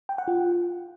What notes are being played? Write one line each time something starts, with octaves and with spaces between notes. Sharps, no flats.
G5
F#5
F4